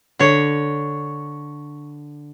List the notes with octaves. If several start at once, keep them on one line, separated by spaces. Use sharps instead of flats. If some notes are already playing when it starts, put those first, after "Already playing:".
D3 C#5